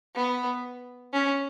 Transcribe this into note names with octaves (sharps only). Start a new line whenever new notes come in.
B3
C#4